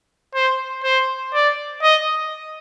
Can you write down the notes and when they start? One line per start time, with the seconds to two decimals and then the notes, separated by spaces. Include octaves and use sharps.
0.35 C5
0.84 C5
1.34 D5
1.83 D#5